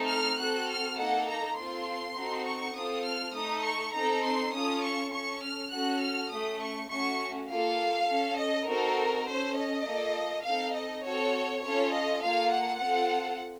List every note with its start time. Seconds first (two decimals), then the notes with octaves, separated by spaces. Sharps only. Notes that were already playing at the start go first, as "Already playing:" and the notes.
Already playing: A3 C4 D#4 A4
0.08 F6
0.38 C4 F#4 A4 F#6
0.68 F6
0.97 A#3 D#4 A4 F#5
1.27 A#5
1.57 C4 F4 A4 C6
2.16 C4 D#4 F#4 A4
2.46 C#6
2.75 C4 F4 A4 D#6
3.05 F6
3.34 A3 D#4 A4 D#6
3.64 C#6
3.94 C4 D#4 A4 A#5
4.24 C6
4.53 C#4 F4 A4 D#6
4.82 C#6
5.12 C#4 A4 C#6
5.41 F6
5.71 C#4 F#4 A4 F#6
6.00 F6
6.30 A3 C#4 A4 D#6
6.61 C#6
6.90 A3 C#4 F#4 C#6
7.48 A#3 F4 A4 F5
8.08 C#4 A4
8.37 D#5
8.68 C4 D#4 F#4 A4 A#4
9.26 C#4 A4 C5
9.56 D#5
9.85 A#3 F4 A4
10.45 C4 D#4 A4 F5
10.75 D#5
11.04 C4 F#4 A4 C#5
11.64 C#4 F4 A4 C#5
11.93 D#5
12.23 A#3 F4 A4 F5
12.53 F#5
12.82 C4 F4 A4